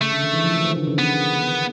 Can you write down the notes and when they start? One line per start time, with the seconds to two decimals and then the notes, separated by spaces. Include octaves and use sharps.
0.01 C#3 A3
0.12 D3
0.23 D#3
0.33 E3
0.44 F3
0.55 E3
0.66 D#3
0.77 D3
0.87 C#3
0.99 D#3 B3